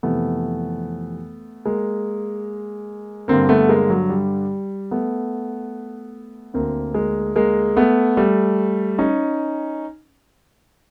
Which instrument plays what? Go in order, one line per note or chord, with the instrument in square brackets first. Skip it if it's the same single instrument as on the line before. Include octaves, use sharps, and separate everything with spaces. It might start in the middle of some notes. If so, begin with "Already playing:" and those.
[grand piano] F2 C3 E3 A3 B3
G#3 A#3
G2 D3 A#3 C4
A3 B3
G#3 A#3
F#3
G3
A3 B3
D2 D3 A#3 C4
G#3 A#3
G#3 A#3
A3 B3
G3 A3
C#4 D#4